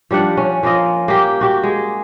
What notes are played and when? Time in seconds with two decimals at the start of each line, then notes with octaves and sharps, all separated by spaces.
0.11 F3 G3 D4 F#5
0.37 C#4
0.63 F3 A#3 F4 D#5
1.08 A#3 G4
1.41 F#4 G4
1.63 G#3